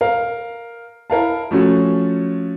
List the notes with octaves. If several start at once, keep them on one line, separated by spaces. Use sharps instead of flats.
A#4 F5
E4 A#4 F5 A5
F3 A3 C#4 F#4